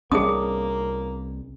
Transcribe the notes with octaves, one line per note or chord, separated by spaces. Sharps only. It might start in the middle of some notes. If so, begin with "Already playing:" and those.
C2 G3 A#3 C#4 D4 G#4 D#6